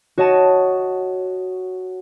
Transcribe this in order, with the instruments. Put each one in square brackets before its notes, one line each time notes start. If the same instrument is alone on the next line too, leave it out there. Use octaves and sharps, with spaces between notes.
[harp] F#4 C#5 D#5 A5 E7